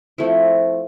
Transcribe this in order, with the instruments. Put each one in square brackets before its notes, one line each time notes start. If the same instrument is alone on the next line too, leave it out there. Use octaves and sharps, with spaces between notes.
[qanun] F3 A3 C4 E4